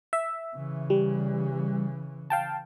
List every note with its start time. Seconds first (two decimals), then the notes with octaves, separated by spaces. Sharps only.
0.13 E5
0.55 C#3 E3
0.90 G3
2.30 F5 G5 A5